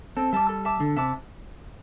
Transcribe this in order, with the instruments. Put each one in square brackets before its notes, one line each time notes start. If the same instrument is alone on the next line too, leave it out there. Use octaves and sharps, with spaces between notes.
[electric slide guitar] C4 [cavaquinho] A4
[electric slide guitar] G3 [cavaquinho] E5 A5 D6
[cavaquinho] A4
E5 A5 D6
[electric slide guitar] D3 [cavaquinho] A4
[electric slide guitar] C3 [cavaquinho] E5 A5 D6